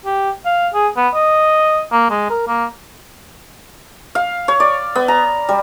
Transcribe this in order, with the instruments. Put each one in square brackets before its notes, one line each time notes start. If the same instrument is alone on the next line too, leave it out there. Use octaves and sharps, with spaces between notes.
[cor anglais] G4
F5
G#4
B3
D#5
A#3
G#3
A#4
A#3
[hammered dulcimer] F5
C#5
D5
B3
A#5
G3